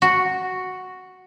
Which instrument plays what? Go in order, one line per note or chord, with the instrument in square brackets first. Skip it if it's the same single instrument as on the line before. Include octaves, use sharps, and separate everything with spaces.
[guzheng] F#4